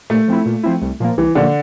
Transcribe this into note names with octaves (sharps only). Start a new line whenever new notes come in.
A#2 A3
F3 C4 E4
A#2
F3 C4 E4
C2
A#2 F3 A#3
C2 E3
A#2 D3 F3 A#3